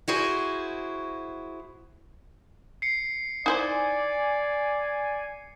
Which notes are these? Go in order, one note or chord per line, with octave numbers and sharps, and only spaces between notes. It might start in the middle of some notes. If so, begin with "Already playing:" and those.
E4 F#4 G#4 C5
C7 C#7
D#4 E4 C5 D5 G#5